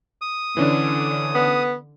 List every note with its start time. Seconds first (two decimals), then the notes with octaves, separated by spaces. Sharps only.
0.22 D#6
0.57 D3 E3 C#4 D4
1.34 B3